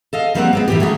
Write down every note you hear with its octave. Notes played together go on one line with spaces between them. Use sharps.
A4 D#5 F5
F3 G3 A#3 C4 D5 F#5
G#3 B3 C4
F#2 A2 C3 E3 G3 G4
F#3 G3 A3 C#4 F4 G#4